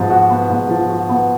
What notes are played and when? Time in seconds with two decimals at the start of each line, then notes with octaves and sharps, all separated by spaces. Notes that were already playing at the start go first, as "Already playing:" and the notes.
Already playing: G#2 F3 B3 F#4
0.10 F#4
0.30 B3
0.50 G#2
0.69 F3
0.89 F#4
1.09 B3